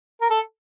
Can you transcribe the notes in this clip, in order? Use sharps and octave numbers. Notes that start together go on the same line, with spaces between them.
A#4
A4